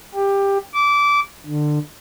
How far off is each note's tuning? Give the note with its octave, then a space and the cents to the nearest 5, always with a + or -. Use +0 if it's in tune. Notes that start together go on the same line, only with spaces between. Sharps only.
G4 +15
D6 -20
D3 +25